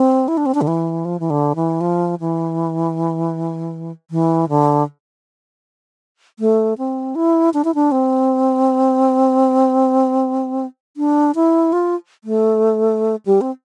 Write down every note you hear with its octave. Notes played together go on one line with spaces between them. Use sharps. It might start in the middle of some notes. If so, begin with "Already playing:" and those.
Already playing: C4
E4
D4
C4
D4
D3
E3
F3
E3
D3
E3
F3
E3
E3
D3
A3
C4
E4
D4
E4
D4
C4
D4
E4
F4
A3
G3
C4